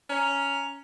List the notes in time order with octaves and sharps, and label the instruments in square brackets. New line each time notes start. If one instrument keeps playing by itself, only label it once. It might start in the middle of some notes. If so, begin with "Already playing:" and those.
[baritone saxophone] C#4 [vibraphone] A#5